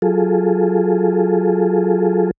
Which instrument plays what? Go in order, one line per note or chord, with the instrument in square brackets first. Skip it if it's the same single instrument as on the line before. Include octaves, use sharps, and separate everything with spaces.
[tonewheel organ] F#3 F4 G#4 A4